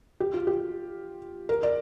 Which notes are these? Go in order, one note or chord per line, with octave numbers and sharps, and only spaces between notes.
G4
F4
G4
A#4
D5